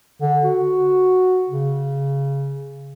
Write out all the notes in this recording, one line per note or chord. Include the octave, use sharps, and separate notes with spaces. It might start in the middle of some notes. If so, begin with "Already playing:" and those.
D3
F#4
C#3